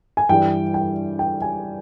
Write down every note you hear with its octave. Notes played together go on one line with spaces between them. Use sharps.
G#5
G2 E3 G3 G5
G5
G5
G#5